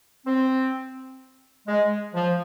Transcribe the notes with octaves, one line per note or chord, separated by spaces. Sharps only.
C4
G#3
F3